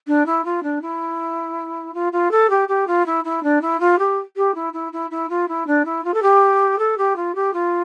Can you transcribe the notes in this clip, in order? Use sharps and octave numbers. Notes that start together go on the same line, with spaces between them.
D4
E4
F4
D4
E4
F4
F4
A4
G4
G4
F4
E4
E4
D4
E4
F4
G4
G4
E4
E4
E4
E4
F4
E4
D4
E4
F4
A4
G4
A4
G4
F4
G4
F4